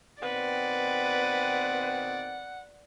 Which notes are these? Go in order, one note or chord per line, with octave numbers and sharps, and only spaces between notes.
B2 D#3 C4 B4 D5 F#5